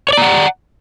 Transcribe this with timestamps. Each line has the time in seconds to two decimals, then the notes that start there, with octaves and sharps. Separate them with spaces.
0.09 C#5
0.13 D5
0.17 A#5
0.22 F#5